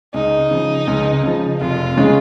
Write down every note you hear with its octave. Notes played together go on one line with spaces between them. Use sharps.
C#2 D#4
C#3 F3
C#2
C#3 F3
F1 F4
C#3 G#3 C#4